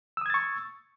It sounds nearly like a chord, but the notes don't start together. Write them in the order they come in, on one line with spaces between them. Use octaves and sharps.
E6 D#6 G#6 A6 C#6